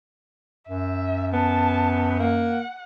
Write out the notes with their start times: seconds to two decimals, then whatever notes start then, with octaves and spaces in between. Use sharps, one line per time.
0.69 F#2 E5
1.33 B3 A5
2.19 A#3 F#5